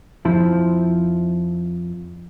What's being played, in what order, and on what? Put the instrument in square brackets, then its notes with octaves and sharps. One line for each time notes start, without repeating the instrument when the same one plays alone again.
[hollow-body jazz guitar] F2 F3 E4 C5